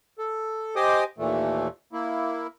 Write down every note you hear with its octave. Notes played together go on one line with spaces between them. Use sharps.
A4
G4 C5 D#5 G#5 D6 D#6
D#2 A#2 E3 A3
A#3 E4